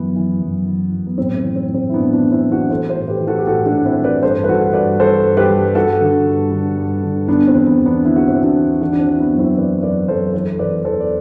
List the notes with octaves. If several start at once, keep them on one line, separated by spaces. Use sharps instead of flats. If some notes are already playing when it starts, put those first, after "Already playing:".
Already playing: F#2 E3 B3
E3
F#2
E3
F#2
B3
A2 C4
C4
E3
C4
A2
C4
E4
A2 B3 D4
B3 D4
E3
C4 E4
E3
D4 F#4
E3 A4 C5
A4 C5
A2
G4 B4
E3
F#4 A4
G4
A2 F#4 A4
D4 F#4
A2
C4 E4
E3
B4 D5
G2 A4 C5
B4
E3 F#4 A4
G2 B4 D5
E3 A4 C5
G2
G4 B4
G2
G2 F#4 A4
D3
G2
D3
G2
D3
D3 B3 D4
C4
E2
B3
E2
B3 D4
D3 E4
F#4
E2 C4 E4
D4 F#4
E2
E3 D4 F#4
D4
C4
E3
E4
B3 D4
F#2
C4 E4
E3 B4 D5
F#2 B4 D5
F#2 A4 C5
E3 A4 C5
E2 B4 D5
E2 A4 C5
D5